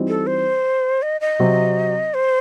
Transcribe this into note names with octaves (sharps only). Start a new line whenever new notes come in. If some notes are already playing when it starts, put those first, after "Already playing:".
Already playing: E3 G3 C4 D#4 F#4
A4
C5
D#5
D#5
C3 F#3 C4
C5